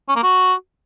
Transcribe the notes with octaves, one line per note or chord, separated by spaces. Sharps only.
C#4
A#3
F#4